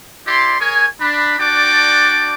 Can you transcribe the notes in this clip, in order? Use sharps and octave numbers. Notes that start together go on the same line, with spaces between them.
E4 G4 D5 C6
G#4 A#4 C#5 G#5
D4 B5
D4 F#4 D5 G5 A5 D6